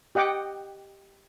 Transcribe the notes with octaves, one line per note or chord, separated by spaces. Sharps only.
G4 D#5 F#5 G5 D6